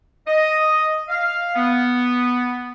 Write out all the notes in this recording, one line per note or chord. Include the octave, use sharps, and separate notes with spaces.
D#5
F5
B3